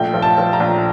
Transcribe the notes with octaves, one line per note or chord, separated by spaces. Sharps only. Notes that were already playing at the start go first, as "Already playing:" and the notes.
Already playing: A#1 A3 G5
F3
A5
F3
A#5
A#1